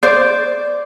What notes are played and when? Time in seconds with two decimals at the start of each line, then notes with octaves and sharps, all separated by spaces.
0.03 C5 D5